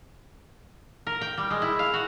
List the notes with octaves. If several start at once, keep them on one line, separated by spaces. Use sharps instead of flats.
A#4
G5
G3
G#3
E4
F5
F#4